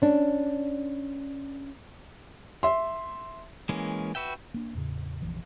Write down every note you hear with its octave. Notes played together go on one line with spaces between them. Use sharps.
C#4 D4
E5 C6
E3 G#3 A#3 C#4
F#4 B4 E5 G5
A#3 D4
E2 A2 C#3
F1 A#1 E3